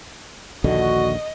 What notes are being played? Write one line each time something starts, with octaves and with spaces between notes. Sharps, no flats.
A#1 D#2 D3 F#4 D#5